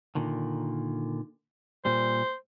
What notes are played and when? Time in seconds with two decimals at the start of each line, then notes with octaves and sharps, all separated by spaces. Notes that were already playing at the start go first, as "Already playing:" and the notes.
0.15 A#2 D3 D#3
1.85 A#2 G3 C5